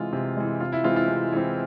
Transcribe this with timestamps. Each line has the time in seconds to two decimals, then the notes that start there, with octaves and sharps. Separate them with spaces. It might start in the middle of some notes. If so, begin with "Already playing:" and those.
Already playing: C3 E3 G#3 F4
0.13 C3
0.37 E3 G#3
0.60 C3 F4
0.72 E4
0.84 E3 G#3 C4 F4
0.96 F4
1.08 C3
1.32 E3 G#3 C4